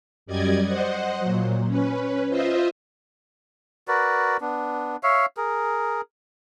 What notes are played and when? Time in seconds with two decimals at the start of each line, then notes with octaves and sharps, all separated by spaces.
0.26 F#2 G3 D5 D#5 G#6
0.65 C5 D#5 F#5
1.20 A#2 F#3
1.66 C#4 B4
2.29 F4 C5 D#5 E5
3.88 F#4 A#4 B4 D5
4.41 B3 D4
5.03 C#5 E5 F5
5.37 G#4 A#4